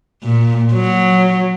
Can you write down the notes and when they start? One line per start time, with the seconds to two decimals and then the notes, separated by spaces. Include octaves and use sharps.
0.23 A#2
0.74 F#3